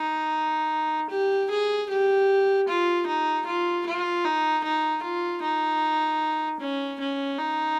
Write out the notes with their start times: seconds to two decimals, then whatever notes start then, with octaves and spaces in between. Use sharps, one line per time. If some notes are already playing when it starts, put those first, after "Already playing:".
Already playing: D#4
1.10 G4
1.51 G#4
1.90 G4
2.69 F4
3.07 D#4
3.47 F4
3.86 F4
4.25 D#4
4.64 D#4
5.03 F4
5.43 D#4
6.60 C#4
7.00 C#4
7.39 D#4